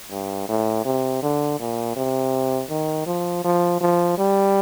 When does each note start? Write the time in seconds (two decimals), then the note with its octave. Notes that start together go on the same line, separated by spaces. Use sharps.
0.11 G2
0.49 A2
0.85 C3
1.22 D3
1.59 A#2
1.96 C3
2.70 D#3
3.06 F3
3.45 F3
3.81 F3
4.18 G3